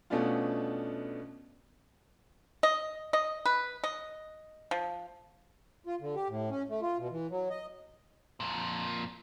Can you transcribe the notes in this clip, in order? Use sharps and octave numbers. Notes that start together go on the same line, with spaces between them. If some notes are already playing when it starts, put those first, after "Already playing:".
B2 A3 B3 C#4 D4 F4
D#5
D#5
B4
D#5
F3
F4
D3
G4
A2
C#4
A3
F4
B2
E3
F#3
D#5
F2 A#2